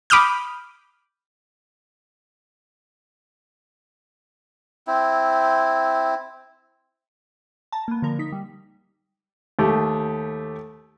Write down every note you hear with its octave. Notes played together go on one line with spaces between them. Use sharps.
B5 D6 D#6 F6 G6
C4 E4
A5 A#5
A#3 B3
D3 F3 A#3 A#4
D#4 B6
G3
D#2 A3 G4